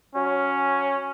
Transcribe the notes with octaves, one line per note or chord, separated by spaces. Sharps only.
F#3 C#4